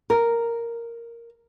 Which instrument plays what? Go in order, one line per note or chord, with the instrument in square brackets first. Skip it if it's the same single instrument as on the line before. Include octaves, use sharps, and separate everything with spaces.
[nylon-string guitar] A#4